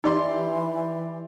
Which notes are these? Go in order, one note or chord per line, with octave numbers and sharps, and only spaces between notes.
E3 D#4 G4 D5 C6